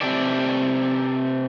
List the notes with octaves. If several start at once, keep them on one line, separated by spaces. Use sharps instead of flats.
C3 G4 A4 D5